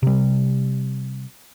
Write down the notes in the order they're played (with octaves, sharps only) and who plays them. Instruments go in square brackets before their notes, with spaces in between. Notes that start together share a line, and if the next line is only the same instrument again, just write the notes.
[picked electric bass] C3 G3